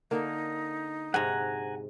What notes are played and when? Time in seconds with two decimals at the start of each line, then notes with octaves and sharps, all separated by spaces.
0.11 D3 A#3 D#4
1.14 G#2 C3 F#5 G#5 A#5